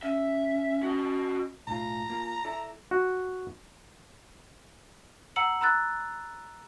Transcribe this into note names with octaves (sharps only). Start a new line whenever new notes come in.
C#4 E5
F#4 D#5
B1 A2 F4 A#5
A#3 F4
E4 A4 D5
F#4
F#5 A#5 E6 C#7 F#7
A#5 B5 E6 F#6 A6